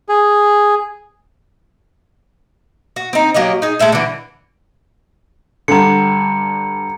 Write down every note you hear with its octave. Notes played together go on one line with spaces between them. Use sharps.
G#4
F#4
C4 D#4
F#3 A#3 G4 D#5
D#4 G#4
G#3 A3 E5 A5
D3 E3
G2 D3 A#5 C#7